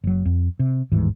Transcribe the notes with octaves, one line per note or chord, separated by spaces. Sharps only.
F#1 F#3
F2
C3
G1 D#2 G#2 E3